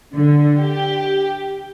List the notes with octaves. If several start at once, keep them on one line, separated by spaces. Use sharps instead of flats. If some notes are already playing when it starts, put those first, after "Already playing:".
D3
G4